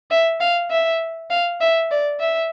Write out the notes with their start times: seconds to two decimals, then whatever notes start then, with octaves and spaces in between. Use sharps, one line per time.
0.11 E5
0.40 F5
0.71 E5
1.30 F5
1.61 E5
1.91 D5
2.20 E5